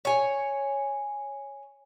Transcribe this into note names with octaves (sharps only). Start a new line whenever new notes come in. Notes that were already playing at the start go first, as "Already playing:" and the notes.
C#5 G#5